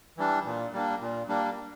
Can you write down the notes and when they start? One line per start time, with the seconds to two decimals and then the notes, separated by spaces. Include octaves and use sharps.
0.17 E3 G3 D4
0.45 A#2
0.73 G3 A#3 D4
1.01 A#2
1.28 G3 A#3 D4